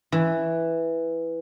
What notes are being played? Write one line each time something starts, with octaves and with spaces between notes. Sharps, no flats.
E3